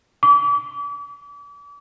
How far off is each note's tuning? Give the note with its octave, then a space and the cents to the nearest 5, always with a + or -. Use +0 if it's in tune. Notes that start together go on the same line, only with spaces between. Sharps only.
D6 -40